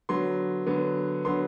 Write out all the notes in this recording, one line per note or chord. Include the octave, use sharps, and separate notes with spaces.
D3 F#3 B3 C6
D3 F#3 B3
D3 F#3 B3 C6